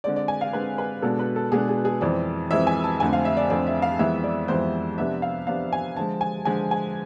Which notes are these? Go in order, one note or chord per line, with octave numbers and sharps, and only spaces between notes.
D3 G#3 C4 D5
D5
G#5
F5
D3 G#3 C4 B4
B4
B2 G#3 B3 D4 A4
B4
A4
B2 G#3 B3 D4 G#4
G#4
G#4
F2 E3 G#3 C4 D5
F2 E3 G#3 C4 E5
G#5
A5
F2 D3 A3 C4 G#5
F5
E5
D5
F2 D3 A3 C4 D5
E5
F5
F2 E3 G#3 B3 E5
D5
F2 E3 G#3 B3 C5
C3 F3 B3 D4 E5
F5
C3 F3 B3 D4 F5
G#5
D3 F3 G#3 A5
G#5
D3 F3 G#3 G#5
G#5